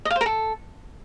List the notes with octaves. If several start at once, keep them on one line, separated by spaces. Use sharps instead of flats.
D#5
F5
C5
A#4
A4